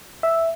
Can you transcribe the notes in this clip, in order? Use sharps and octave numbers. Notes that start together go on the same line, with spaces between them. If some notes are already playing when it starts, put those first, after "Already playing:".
E5